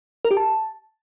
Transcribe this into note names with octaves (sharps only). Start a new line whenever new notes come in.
A#4
G4
A5